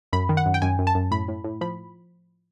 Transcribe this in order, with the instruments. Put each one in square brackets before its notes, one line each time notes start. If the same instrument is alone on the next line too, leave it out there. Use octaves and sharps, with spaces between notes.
[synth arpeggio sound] F#2 B5
D#3
F#5
F#2
G5
F#2 G#5
F#2
A5
F#2
A2 B5
A2
A2
F3 B5